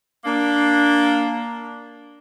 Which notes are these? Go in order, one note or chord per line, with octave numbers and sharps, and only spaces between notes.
A#3 D4